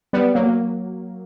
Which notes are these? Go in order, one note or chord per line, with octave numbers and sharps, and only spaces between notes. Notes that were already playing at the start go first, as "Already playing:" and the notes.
G3 B3
F#3 A#3